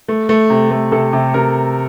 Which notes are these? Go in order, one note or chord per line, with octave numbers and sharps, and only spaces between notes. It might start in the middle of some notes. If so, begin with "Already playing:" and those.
A3
A3
C3
A3
C3 A4
C3
C3 A#4